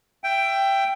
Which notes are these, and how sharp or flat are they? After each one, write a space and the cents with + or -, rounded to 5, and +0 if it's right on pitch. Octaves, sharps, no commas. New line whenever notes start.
E5 +20 G5 +0